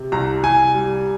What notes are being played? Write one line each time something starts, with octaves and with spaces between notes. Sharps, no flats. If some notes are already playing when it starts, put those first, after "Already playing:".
Already playing: C3
C2 A#5
C2 G#5
G3